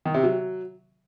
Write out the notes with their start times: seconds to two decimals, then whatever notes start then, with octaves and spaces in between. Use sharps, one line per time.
0.05 D#3
0.14 C3
0.23 F#3